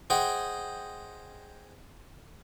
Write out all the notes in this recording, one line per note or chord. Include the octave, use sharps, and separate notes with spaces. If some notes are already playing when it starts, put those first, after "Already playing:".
G#4 C5 D#5 F#5 G5